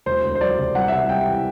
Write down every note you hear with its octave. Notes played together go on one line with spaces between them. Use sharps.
E1 C5
D2
C5
F#3 D5
C3
C2 F#5
E5
C3 F#5
G3 G5
E3